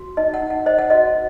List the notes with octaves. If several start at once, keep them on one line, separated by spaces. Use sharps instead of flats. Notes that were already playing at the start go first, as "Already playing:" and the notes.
Already playing: F#4
D#4 D#5
F#5
D#4
F#5
C5 D#5
F#5
F#4 D#5